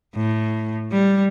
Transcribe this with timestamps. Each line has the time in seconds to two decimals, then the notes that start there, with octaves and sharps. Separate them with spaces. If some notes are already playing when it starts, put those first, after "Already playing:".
0.16 A2
0.92 G3